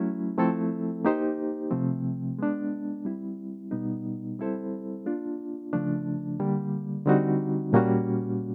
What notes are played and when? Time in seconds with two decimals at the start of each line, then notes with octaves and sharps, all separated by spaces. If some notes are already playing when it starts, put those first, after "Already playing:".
Already playing: F#3 A3 C#4 E4
0.38 F3 A3 C4 E4 A4
1.05 A#3 D#4 G4 C5
1.71 C3 F3 A3 C4
2.39 G#3 B3 D4
3.05 G3 C4 E4
3.71 B2 G3 B3 D#4
4.39 G3 C4 E4 A4 C5
5.06 A#3 D4 F4
5.73 C#3 F3 A3 D4
6.40 D3 G3 A#3
7.06 D3 G3 C4 D#4 F#4
7.73 A#2 G3 A#3 C#4 F#4